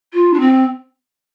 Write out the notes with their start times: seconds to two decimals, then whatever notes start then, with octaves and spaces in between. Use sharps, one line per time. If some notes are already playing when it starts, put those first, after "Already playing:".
0.14 F4
0.34 D4
0.40 C4